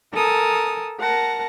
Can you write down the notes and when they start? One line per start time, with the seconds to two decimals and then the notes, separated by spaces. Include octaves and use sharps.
0.13 A4 A#4 G#5 D#6
1.00 A#4 F#5 A5 A#6